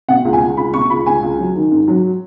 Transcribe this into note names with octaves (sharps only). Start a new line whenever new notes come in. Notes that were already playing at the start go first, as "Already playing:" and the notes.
B2 F#5
C#2
G#5
C#2
C#2 B5
B2 C#6
C#2 B5
C#2 G#5
C#2
F#3
D#3
G#2
F#3